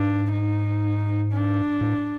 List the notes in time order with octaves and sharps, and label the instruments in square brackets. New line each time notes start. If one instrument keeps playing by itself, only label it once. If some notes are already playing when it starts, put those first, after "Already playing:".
Already playing: [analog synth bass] G#2 [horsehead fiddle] D4
[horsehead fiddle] D#4
D4
[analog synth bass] A2